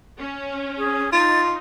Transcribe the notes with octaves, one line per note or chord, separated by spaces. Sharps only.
C#4
G#4
D#4 F4 A6